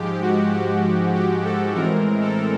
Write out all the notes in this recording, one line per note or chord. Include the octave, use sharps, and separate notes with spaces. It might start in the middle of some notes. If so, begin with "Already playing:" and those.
Already playing: G#2 F3 G#3 G4
F#4
G4
G4
A4
A2 E3 G#3 C4 A#4
A4